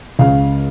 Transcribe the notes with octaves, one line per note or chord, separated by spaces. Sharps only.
C#2 F5